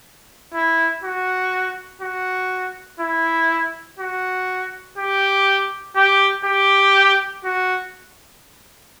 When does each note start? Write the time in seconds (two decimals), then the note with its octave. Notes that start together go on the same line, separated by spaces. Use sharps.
0.54 E4
1.03 F#4
2.01 F#4
3.00 E4
3.99 F#4
4.98 G4
5.96 G4
6.45 G4
7.45 F#4